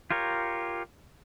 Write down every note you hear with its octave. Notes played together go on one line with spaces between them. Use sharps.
F4 G4 A#4 C#5